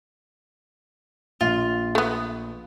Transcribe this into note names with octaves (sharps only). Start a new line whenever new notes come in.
A#1 F4
A3 B3